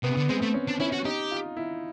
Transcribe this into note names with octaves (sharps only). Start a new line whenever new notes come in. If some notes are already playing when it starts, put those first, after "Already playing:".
C3 B3
D3
G#3 C4
A3
C#4
D4
C#4 E4
F#4
D#4 G4
F4
E4